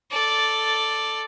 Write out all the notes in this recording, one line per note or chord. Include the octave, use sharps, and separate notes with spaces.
A4 D5